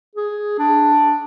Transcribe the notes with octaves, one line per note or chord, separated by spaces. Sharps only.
G#4
D4